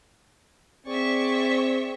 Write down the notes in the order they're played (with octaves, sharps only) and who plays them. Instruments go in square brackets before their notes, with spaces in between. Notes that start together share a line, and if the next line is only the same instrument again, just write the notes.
[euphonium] C4 [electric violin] G#4 D5 [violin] E5 C#6